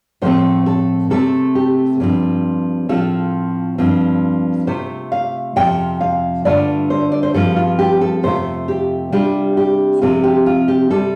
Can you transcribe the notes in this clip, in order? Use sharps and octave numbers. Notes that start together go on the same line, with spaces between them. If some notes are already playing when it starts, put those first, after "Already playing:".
A2 F3 A3 C4 C5
A4
C3 A3 C4 A4
G4
G2 F3 C4
A2 F3 C4 F4 A4
G2 F3 C4
C3 A3 F4 C5
F5
F2 C3 F3 G5
F5
G2 D3 A3 F4 D5
C5
D5
C5
G2 F3 C4 F4 A4
F4
G4
A4
F2 C3 A3 F4 C5
G4
C3 G3 D4 F4 G4
G4
C3 F3 C4 F4 A4
G4
F4
G4
C3 G3 A4